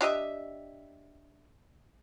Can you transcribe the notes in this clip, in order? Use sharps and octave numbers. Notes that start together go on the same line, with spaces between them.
D4 G4 D#5 E5